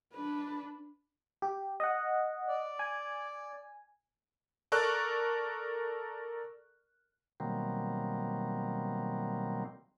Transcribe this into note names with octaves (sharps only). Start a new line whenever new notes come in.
D4 B4
G4
D#5 F#5
D5
G#5
A4 A#4 D5 C#6 F#6
B2 D#3 F#3 G3 A#3 C4